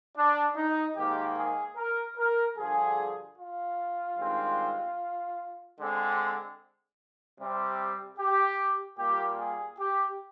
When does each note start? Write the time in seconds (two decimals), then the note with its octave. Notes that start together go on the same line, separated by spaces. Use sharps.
0.16 D4
0.56 D#4
0.96 G#2 D#3 A#3 G4
1.37 G#4
1.76 A#4
2.17 A#4
2.56 G2 D3 F3 G#4
3.37 F4
4.16 G2 D#3 G#3 C4
5.77 D3 G#3 C4
7.38 C3 G3 C4
8.18 G4
8.97 A#2 G3 A#3 G4
9.38 G#4
9.78 G4